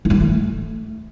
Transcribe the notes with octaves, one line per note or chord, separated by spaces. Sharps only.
E3
F#3
E3
A3